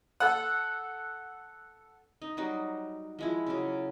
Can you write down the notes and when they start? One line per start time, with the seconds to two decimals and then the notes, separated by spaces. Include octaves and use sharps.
0.20 A4 F#5
2.22 D#4
2.37 F#3 G3 D#4 F#4
3.19 F3 G#3 E4
3.46 C#3 F#3